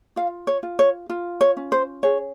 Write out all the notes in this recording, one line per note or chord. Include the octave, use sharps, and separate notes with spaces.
F4 F5
C#5
F4
C#5
F4
C#5
C#4
C5
G#4 C#5